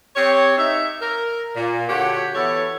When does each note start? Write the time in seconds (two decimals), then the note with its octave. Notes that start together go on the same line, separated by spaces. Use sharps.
0.16 C4 G4 C#5
0.58 D#4 E5
1.01 A#4
1.56 A#2
1.89 D3 F#4 G4 C#5 F#5
2.35 E3 B3 E4 A4 C#5